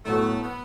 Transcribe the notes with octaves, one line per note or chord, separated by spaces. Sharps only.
A2 F#3 A3 B3 F#4
B3